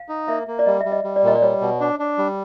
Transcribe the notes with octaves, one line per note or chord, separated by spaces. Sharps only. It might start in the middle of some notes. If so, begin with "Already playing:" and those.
Already playing: F5
D#4
A#3 E5
A#3
D5
G3 D#5
G3 E5
D#5
G3
D5
A#2 D#5
D5
G3 C#5
B2
D4
D4
G3